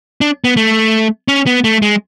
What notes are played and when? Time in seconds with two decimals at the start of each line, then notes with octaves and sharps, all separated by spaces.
0.21 D4
0.44 B3
0.57 A3
1.28 C#4
1.46 B3
1.64 A3
1.82 G#3